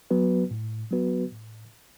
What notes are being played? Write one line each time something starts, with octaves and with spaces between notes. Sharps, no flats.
F#3 B3 F#4 B4
A2
F#3 B3 F#4 B4
A2